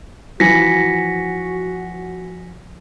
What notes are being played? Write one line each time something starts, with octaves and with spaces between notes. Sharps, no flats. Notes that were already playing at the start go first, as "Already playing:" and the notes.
E3 F3 F#4 G#5 A#6 B6 C#7